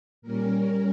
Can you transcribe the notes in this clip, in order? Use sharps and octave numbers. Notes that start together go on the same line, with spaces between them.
A#2 G3 C#4 A#4